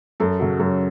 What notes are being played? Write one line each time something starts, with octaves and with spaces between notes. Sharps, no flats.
F#2 A4
C#3 F#3
F#2